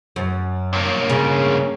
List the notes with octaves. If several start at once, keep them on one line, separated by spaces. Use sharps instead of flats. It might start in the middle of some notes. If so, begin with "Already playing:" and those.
F#2
G2 A#3 C#5
C#3 C#4